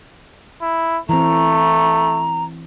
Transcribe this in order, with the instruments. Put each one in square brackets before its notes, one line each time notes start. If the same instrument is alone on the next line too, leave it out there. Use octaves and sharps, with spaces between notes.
[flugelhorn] E4
[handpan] E3 C4 [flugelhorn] A3 [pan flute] A#5